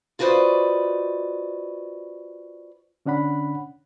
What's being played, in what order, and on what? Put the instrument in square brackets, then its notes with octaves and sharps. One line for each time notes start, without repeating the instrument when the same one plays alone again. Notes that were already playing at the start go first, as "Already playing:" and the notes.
[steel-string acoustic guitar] F4 F#4 B4 C5 D5 D#5
[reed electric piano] D3 C#4 D4 F#5 B5